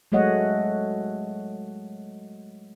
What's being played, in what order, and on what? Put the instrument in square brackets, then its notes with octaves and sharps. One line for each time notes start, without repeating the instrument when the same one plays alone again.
[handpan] F#3 G#3 A3 C#5 D#5 F#5